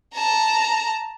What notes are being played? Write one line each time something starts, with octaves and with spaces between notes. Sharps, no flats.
A5 A#5